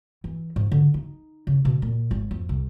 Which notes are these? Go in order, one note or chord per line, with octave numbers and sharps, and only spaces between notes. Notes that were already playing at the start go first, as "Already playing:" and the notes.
E3
G#2
D3
D#4
C#3
B2
A#2
G#1
F2
C2